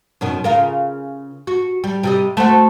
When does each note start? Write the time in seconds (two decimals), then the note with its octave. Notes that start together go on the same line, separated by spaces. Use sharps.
0.21 F#2 B2 D#3
0.44 C#3 F4 A#4
1.47 F#4
1.84 G3
2.03 C3 G3 D#5
2.37 A3 C4 F#4